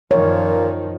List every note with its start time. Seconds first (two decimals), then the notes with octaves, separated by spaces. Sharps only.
0.11 F#2 A#2 D#3 F3 C#5